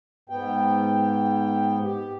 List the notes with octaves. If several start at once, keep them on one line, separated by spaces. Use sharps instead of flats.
G#2 B3 G5
G4